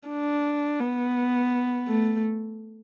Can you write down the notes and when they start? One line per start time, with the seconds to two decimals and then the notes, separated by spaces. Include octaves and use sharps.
0.09 D4
0.80 B3
1.88 A3